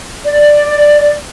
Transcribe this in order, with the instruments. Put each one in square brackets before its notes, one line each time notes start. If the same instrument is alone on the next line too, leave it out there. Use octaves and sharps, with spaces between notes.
[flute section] D5